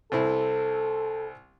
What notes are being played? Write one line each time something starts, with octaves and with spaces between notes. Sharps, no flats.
C2 C4 E4 A4